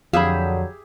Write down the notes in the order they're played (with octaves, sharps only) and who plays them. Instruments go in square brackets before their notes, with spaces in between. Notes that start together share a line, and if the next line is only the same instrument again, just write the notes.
[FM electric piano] F2 [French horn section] D3 F#3 [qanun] G4 G#4 E5 [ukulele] F5 B5